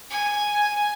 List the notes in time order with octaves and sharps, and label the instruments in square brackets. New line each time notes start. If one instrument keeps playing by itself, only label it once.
[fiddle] G#5